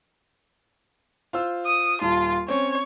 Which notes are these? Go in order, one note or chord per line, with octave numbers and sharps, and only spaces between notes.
F4 C5 E6
D#6
D#1 F4 A5
C4 C#4 C#5